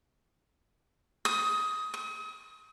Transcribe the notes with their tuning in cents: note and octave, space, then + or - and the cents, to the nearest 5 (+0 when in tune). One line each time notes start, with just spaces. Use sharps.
D#6 +20
D#6 +35